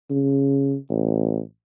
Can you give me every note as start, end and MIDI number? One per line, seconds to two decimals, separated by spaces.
0.10 0.76 49
0.90 1.41 33